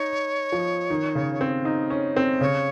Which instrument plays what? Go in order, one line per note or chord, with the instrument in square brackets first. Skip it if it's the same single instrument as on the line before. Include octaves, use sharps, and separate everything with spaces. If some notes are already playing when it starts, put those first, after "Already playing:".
Already playing: [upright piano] D#4 [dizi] C#5
[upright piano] F3
D#3
C#3
C4
D#4
C#4
C4
[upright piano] C#3 [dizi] C#5